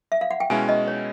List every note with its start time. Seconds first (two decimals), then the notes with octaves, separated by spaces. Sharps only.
0.12 E5
0.21 F5
0.31 F#5
0.40 G5
0.50 B2 G#3 C#4 E4 G#5
0.69 D#5
0.88 C#5